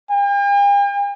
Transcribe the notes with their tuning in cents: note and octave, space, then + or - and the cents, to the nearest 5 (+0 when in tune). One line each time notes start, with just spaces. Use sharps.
G5 +45